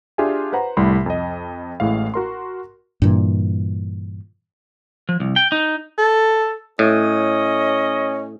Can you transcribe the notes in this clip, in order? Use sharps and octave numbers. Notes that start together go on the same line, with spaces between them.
D4 F4 G4 G#4 E5 G#5
B4 C5 F#5 A#5
C2 A2 G3 B5 C6
F2 D#5
A1 A2 G#3 F5
F#4 A#4 C6
G2 A#2 E3
F3
C2
G5
D#4
A4
A2 C#4 D#5